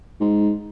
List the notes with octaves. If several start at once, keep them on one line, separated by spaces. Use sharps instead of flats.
G#2